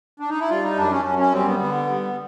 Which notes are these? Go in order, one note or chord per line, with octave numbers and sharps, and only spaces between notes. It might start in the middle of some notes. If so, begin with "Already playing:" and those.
D4
D#4
E4
G3 F4
D#4
F#2 D4
C#4
F#2 C#4
C#4
G3 C4
B3
D3 B3
G3